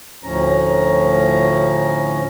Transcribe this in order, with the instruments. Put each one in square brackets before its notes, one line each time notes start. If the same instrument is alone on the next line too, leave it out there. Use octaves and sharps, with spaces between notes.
[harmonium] D2 A2 F3 C#4 A#5